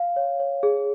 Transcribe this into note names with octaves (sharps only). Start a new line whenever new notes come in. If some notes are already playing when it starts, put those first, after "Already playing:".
Already playing: F5
C#5
C#5
G#4